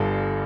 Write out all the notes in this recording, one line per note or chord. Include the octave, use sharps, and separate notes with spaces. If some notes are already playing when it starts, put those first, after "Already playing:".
Already playing: G1 G2 D3 A4